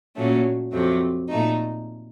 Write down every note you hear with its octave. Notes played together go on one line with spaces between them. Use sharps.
A#2 F#3 A3 C#4
F2 C3 F#3 A3
A#2 A3 D#4